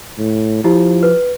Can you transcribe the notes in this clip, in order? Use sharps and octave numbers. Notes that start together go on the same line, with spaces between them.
A2
F3 E4 F4 G4
B4